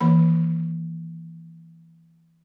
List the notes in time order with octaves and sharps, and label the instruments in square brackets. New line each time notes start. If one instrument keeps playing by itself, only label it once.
[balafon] D#3 E3 A#3 B5